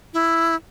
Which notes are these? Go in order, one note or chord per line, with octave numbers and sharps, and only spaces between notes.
E4